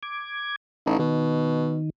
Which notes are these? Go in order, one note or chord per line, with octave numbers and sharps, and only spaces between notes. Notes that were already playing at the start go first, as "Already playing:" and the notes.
D6 G#6
A1 D#4
B2 D#3